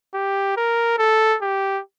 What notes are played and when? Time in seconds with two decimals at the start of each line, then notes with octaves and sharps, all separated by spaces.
0.14 G4
0.56 A#4
0.98 A4
1.42 G4